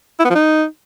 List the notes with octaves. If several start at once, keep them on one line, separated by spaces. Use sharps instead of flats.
E4
B3
F3
D#4